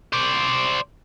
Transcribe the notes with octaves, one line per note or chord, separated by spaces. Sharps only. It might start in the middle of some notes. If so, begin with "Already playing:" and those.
C5 D5